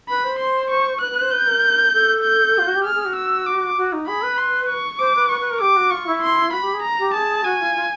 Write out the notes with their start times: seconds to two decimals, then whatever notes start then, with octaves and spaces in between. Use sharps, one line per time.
0.09 B4 B5
0.24 C5
0.39 C6
0.70 C#6
1.00 B4 F#6
1.11 B4
1.21 C5
1.31 B4 G6
1.47 A#4
1.93 A4
2.23 G6
2.58 F4
2.67 F#4
2.75 G4
2.84 G#4 F6
2.94 G#4
3.05 F#4
3.16 E6
3.46 D6
3.77 F#4
3.92 D#4
4.07 G#4 B5
4.23 B4
4.38 C6
4.69 C#6
4.99 C5 D6
5.15 B4
5.29 B4 C#6
5.40 B4
5.50 A#4
5.60 G4 D6
5.76 F#4
5.90 F4 C#6
6.06 E4
6.22 C6
6.48 F4
6.52 F#4 B5
6.62 G4
6.73 G#4
6.82 A#5
6.98 G4
7.14 G#4 A5
7.44 F#4 G#5
7.59 F4
7.75 F4